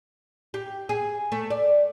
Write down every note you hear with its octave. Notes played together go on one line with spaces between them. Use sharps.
G4
G#4
A3
D5